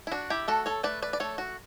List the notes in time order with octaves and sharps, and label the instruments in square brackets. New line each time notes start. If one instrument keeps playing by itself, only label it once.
[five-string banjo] E4
D4 F#4
E4 G4
A3 F#4 A4
A4 C#5
A3 B4 D5
B4 D5
D5
A3 A4 C#5
F#4